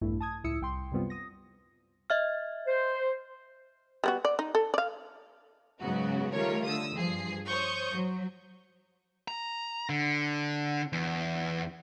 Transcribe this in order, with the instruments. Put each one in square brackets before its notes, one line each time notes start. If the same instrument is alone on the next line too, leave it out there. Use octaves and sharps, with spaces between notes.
[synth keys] A#1 E2 G2 A3 E4
A5 D#6 G#6
C#2 A2 E4 D#6 E6 C#7
C2 G5 C6
F#2 C3 G3 B3 C4 F4
D#6 A#6
[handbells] D#5 E5 F6
[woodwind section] C5
[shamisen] G3 B3 F#4
D5
D#4
A4
D5 F5
[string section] G#2 C#3 F#3 B3 F#4
D#3 G3 A3 F4 A#4 C#5
D3 D#6 E6
G2 F3 G#4 C7
C5 C#5 C#6 D#6 G6
F#3
[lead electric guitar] A#5
D3
E2